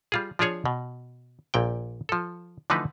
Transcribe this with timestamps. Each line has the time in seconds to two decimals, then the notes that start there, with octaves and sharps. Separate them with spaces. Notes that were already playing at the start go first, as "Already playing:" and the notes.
0.12 G3 F4 G#4
0.39 F3 D4 F4 G#4 C#5
0.65 B2
1.54 A#1 A#2 G5
2.09 F3 A4
2.70 D3 E3 F3 A3 D#4 B4